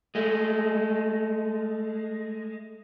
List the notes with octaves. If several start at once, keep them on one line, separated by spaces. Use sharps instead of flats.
G#3 A3